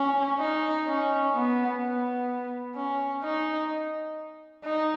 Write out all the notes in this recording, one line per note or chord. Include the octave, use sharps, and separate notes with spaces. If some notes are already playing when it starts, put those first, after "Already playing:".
Already playing: C#4
D#4
C#4
B3
B3
C#4
D#4
D#4